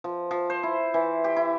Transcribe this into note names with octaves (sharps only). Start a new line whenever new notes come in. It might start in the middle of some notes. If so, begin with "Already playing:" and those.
F3
F3
C5
E4
E3
G4
E4